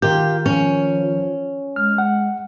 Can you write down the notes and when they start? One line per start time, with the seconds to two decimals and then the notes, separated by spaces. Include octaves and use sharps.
0.02 D#3 F4 G4 A#4 G6
0.46 F3 C#4
1.76 G#3 F6
1.98 F#5